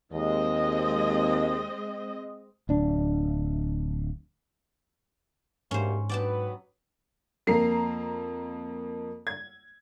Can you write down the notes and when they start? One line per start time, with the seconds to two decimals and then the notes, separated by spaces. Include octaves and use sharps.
0.13 D#2 G#3 C4 D#5
2.69 D1 D4
5.71 D2 G#2 A#3 C#4 G4 C5
6.09 F#3 B3 B4 D5 G5 A5
7.47 F2 A#3 A#5 C7
9.27 G#6